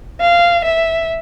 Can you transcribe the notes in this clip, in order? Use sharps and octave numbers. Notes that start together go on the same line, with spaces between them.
F5
E5